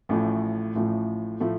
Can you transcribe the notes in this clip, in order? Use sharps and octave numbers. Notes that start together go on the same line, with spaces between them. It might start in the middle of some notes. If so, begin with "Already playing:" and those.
A1 A2 F3 A3
A1 A2 F3 A3
A2 F3 A3